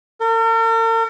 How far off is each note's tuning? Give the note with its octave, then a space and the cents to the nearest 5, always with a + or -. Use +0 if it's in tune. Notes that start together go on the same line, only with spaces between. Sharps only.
A#4 -45